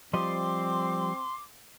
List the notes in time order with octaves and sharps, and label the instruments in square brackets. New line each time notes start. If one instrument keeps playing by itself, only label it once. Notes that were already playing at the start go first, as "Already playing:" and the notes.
[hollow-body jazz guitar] F3 G3 D#5 [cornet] C4 [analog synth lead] C6 [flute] D6